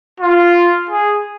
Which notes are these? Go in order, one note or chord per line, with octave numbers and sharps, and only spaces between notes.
F4
G#4